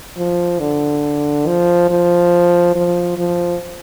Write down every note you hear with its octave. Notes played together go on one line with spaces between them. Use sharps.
F3
D3
F3
F3
F3
F3